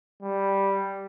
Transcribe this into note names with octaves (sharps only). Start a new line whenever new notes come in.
G3